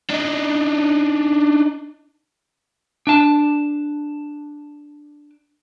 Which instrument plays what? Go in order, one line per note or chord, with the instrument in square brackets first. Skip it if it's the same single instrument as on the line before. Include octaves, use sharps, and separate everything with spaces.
[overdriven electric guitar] D4 D#4
[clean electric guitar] D4 A5